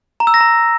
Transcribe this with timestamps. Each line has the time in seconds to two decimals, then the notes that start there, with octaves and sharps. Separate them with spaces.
0.20 A#5
0.27 E6
0.34 A#6
0.41 A#5